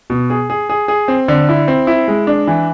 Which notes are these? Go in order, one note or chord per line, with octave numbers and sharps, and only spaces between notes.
B2
G#4
G#4
G#4
G#4
C4
D3
E4
C4
E4
G#3
D4
E3